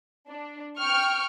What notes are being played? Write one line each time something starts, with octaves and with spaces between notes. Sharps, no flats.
D4
G5 C#6 F6